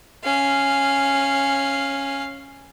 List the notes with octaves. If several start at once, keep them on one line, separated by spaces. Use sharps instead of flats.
C#4 F5